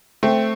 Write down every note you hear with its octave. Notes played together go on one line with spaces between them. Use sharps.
A3 C4